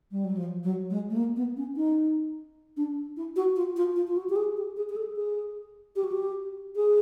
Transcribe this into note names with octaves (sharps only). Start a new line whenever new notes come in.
G3
F#3
F3
F#3
G#3
A3
A#3
B3
C#4
D#4
D4
E4
F#4
F4
F4
F4
F4
F#4
G4
G#4
G4
G#4
G#4
A4
G#4
G4
F#4
G4
G#4